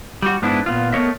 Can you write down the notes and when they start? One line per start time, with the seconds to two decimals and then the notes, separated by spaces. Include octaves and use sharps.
0.22 G3 F#4
0.42 G#2 B3 D4 E4
0.66 A#2 B3 F4
0.92 A3 B3 A#4 C#5 D#5 E5